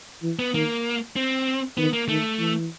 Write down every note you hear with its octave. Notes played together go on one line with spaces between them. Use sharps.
E3
B3
D#3 A#3
C4
D#3 B3
A#3
D#3 A3
E3